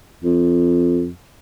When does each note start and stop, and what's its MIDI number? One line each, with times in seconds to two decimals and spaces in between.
0.24 1.10 41